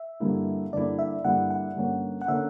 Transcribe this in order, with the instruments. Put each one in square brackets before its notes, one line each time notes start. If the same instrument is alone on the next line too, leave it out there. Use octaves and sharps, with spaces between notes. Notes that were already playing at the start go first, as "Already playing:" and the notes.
Already playing: [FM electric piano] E5
[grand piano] G2 D3 A#3 E4
[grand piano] G2 D3 A#3 E4 [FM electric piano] D5
[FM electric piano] E5
[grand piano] G2 D3 A#3 E4 [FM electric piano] F#5
[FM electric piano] F#5
[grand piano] G2 D3 A#3 C#4
[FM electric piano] F#5
[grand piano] D3 A#3 C#4 [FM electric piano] E5